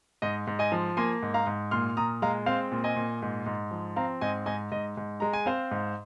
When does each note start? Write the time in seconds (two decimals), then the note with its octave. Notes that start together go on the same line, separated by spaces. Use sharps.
0.22 G#2 D#5
0.47 G#2
0.59 D#5 G#5
0.72 F3
0.97 A#3 G#5 C6
1.22 G#2
1.34 F5 A#5
1.47 G#2
1.71 A#2 C6 F6
1.97 A#2 A#5 D#6
2.22 G#3 F5 A#5
2.46 C4 C5 F5
2.72 A#2
2.84 D#5 G#5
2.96 A#2
3.22 G#2
3.46 G#2
3.71 F3
3.96 C4 F5 A#5
4.21 G#2 D#5 G#5
4.46 G#2 D#5 G#5
4.72 G#2 D#5
4.97 G#2
5.20 G#3 A#5
5.33 G#5
5.46 C4 C5 F5
5.71 G#2